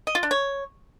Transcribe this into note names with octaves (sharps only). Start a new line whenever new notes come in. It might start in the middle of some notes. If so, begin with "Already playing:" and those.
D#5
F4
D4
C#5